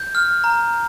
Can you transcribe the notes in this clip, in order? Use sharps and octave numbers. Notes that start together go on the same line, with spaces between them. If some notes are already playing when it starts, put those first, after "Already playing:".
Already playing: G6
F6
A#5